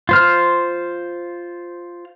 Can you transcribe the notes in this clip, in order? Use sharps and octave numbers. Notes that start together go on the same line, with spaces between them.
F4 C5 F6